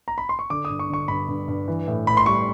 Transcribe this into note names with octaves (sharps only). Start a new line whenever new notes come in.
A#5
B5
C6
C#6
D3 D6
D#6
G2
C#6
D3 C#6
G2 B5
G2
G2
E3
A2
A2 B5
C6
G3 C#6